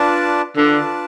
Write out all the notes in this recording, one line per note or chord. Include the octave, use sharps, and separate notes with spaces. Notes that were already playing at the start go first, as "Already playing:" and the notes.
Already playing: D4 F4 B4 D5 A5
D3 D4 F4 B4 D5 A5